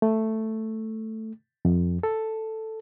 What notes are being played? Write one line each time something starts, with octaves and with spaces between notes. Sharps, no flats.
A3
F2
A4